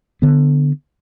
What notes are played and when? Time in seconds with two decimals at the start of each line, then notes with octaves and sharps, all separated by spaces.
0.22 D3 B3